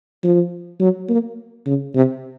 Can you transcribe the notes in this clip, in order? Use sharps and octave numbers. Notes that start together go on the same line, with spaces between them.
F3
F#3
A#3
C#3
C3